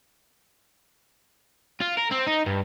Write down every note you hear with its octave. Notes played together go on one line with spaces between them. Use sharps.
F4
A#4
C4
D#4
G2